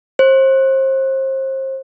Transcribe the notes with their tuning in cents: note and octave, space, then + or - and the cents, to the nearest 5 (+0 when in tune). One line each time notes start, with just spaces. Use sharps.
C5 +30